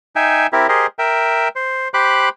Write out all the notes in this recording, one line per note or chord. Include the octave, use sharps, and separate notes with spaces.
D#4 E5 G5 G#5
C4 E4 G4 A#4
G4 G#4 A#4 C5 D#5
A#4 E5 G5
C5
G4 C5 B5 D6 F#6